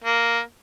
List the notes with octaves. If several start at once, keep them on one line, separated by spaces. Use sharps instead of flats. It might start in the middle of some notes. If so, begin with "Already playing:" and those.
A#3